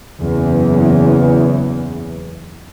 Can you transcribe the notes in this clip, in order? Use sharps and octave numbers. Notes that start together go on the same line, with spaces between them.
F#1 E2 C#3 E3